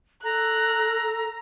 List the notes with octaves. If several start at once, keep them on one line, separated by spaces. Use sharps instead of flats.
A4 A#5 F#6